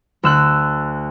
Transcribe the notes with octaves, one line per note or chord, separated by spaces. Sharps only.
D2 E6 F#6